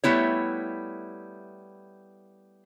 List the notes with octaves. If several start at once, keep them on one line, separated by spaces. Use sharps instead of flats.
G3 A3 B3 E4 C#5